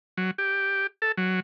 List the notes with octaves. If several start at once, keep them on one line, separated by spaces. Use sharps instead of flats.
F#3
G4
A4
F#3